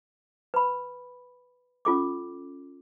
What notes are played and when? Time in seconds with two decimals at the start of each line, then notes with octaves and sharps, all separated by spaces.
0.54 B4 B5
1.85 C#4 F4 A4 D6